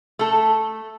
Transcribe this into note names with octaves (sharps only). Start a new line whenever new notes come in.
A3 A4